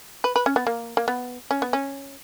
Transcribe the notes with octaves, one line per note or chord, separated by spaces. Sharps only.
B4
B4
C#4
B3
A#3
A#3
B3
C#4
B3
C#4